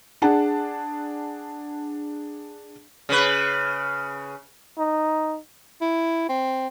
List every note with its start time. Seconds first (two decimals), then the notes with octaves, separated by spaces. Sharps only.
0.22 D4 G#4 F#5 A5
3.09 C#3 B4
4.78 D#4
5.81 E4
6.29 C4